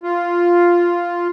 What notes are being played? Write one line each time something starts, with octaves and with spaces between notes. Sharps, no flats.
F4